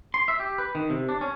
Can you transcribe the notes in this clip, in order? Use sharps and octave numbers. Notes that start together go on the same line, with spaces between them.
C6
E5
G4
B4
D#3
C3
D4
C#4